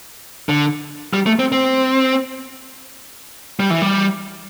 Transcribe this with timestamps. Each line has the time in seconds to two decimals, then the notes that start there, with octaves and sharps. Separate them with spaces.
0.49 D3
1.13 G3
1.26 A3
1.39 C4
1.52 C4
3.60 G3
3.70 E3
3.82 G3